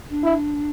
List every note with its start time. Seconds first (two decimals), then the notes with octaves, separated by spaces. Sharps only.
0.09 D4
0.24 E4